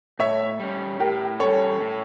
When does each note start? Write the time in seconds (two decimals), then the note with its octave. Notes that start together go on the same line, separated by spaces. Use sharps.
0.19 A2 C#5 E5
0.60 G3 C#4
1.00 A2 G4 A#4
1.39 G3 C#4 A4 C#5
1.81 A2